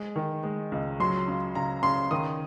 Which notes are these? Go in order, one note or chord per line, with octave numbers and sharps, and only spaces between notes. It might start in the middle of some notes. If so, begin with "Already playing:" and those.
Already playing: G#3
D#3
G#3
C#2
F#3 C6
C#3
C#3 A#5
C#3 C6
D#3 D#6